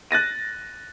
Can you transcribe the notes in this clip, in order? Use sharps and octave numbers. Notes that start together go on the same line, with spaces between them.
F#6 A6 A#6 D#7